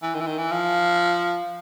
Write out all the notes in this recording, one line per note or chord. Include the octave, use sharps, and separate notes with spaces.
E3
D#3
E3
D#3
E3
F3